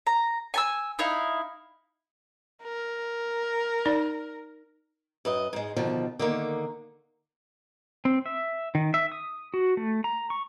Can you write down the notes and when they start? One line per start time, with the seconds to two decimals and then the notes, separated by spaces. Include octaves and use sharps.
0.07 A#5
0.54 G#5 A5 E6
0.99 D#4 E4 F5
2.63 A#4
3.85 D#4 D5
5.25 F#2 B4 D#5
5.53 G#2 G#3
5.76 B2 D3 D#3 F3
6.19 D3 D#3 A#3
8.05 C4
8.26 E5
8.75 D#3
8.94 E5
9.12 D#6
9.54 F#4
9.77 A3
10.04 A#5
10.30 C#6